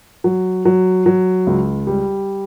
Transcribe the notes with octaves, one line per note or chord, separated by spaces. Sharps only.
F#3
F#3
F#3
C#2
G3